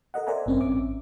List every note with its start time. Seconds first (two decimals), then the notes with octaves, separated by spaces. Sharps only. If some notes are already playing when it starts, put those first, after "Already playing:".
0.14 A4 A#4 D#5 F#5
0.27 A#4 C5 D5 E5 G#5 A#5
0.46 G#1 G2 C4 C#4 C5
0.59 A1 E5 D6
0.73 A1